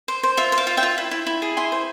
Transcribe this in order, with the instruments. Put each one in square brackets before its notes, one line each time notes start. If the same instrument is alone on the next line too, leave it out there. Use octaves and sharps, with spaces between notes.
[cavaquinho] C5
C5
F4 E5
C5
F5
F4
E5 G5
F4
E4
E4
E4
G#4
E4 G#5 C6
C5